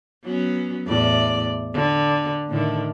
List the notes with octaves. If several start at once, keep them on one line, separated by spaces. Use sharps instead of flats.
F#3 B3 C#4
E2 A2 D5
D3
A2 D3 D#3